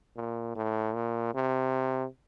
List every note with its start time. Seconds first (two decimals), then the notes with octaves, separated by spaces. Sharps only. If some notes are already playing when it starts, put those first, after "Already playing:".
0.16 A#2
0.56 A2
0.95 A#2
1.34 C3